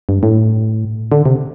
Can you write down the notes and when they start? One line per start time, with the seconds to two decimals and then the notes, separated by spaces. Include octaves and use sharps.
0.09 G2
0.23 A2
1.12 D3
1.26 C3